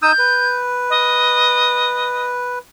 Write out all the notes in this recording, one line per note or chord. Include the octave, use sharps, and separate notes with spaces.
D#4 D#6 E6 G6
B4
D#5